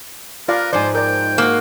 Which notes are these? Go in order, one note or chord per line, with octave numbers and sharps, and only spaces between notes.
F4 A#4 B4 D5 F5
G#2 F3 C5 D5 G#5
A#4 D5 G5
A#3 F#4 G#4